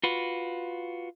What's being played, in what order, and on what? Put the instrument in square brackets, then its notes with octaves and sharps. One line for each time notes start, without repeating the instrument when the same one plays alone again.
[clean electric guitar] F4 F#4 B4